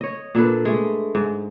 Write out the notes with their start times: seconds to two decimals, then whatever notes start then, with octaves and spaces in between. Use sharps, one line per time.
0.01 C#5 D#5
0.35 A#2 D4 A4 B4
0.65 G#3 A3
1.15 G#2